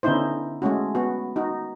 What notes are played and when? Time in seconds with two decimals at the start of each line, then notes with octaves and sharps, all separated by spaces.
0.03 D3 B3 C#4 D#4 E4 C5
0.62 G#3 A3 C#4 F#4
0.95 B3 F#4
1.36 D#4 F#4